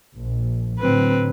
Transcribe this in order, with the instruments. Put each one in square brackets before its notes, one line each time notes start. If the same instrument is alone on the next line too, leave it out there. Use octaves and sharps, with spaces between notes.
[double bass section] A#1
[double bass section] A2 D3 F#3 [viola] C4 B4